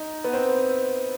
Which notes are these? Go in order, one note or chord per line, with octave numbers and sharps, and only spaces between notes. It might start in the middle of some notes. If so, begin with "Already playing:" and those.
Already playing: D#4
B3
C4